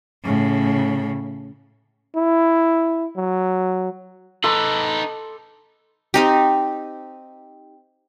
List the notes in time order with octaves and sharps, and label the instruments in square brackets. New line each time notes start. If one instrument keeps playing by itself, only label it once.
[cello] A2 C#3
[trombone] E4
F#3
[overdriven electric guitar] D#4 B4 [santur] A4 C6 D6
[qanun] C4 D#4 G4